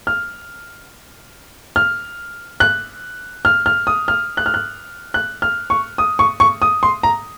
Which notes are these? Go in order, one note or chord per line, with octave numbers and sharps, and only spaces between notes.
F6
F6
F#6
F6
F6
D#6
F6
F#6
F6
F#6
F#6
F6
C#6
D#6
C#6
C#6
D#6
C6
A#5